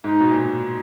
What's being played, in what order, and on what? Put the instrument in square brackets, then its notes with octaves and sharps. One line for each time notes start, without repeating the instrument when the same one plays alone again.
[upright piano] G#2 [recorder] D#4
[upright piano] B2
A#2